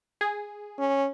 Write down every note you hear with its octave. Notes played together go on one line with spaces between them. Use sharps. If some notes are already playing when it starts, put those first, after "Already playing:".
G#4
C#4